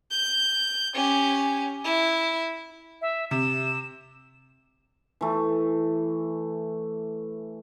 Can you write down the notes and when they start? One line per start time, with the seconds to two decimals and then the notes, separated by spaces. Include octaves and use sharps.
0.11 G6
0.95 C#4 G4
1.85 E4
3.02 E5
3.31 C3 E7
5.21 E3 A3